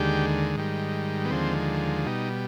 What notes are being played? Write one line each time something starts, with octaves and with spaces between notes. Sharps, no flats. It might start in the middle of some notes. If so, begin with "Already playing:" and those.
Already playing: D#2 D3 G#3 G4
G#2 D#3 G3
B3
D#2 D3 F3 G#3 C4
B2 G3 D#4